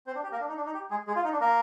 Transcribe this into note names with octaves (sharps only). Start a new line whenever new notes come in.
C4 C5
D4
G4
A#3 A#4
D4
D#4
D4
D#4
G4
G#3 G#4
G#3 G#4
F4
D#4
D4
A#3 A#4